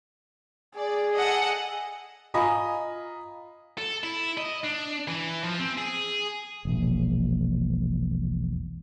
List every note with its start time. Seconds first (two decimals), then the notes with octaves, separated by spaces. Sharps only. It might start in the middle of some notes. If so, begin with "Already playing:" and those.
0.77 G#4 D5
1.14 A4 D#5 F#5
2.34 F4 D#5 G#5 A#5 B5
3.77 A4
4.03 E4
4.37 D#5
4.64 D4
5.08 E3
5.44 F3
5.59 C4
5.78 G#4
6.65 E1 A#1